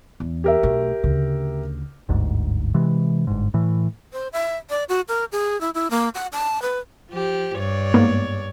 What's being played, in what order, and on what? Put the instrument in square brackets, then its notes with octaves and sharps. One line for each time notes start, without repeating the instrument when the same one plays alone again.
[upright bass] E2
[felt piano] G4 A#4 E5
[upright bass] B1 A3
D2 C#3
[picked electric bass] G1 D2 G#2
C3 E3 G#3
G1 G#2
A2 E3
[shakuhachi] C5
E5
D5
F#4
A#4
G#4
E4
E4
A#3
F#5
A5
B4
[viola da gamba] F3 G4
G2 C#5 D5
[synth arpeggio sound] G#2 A#3 B3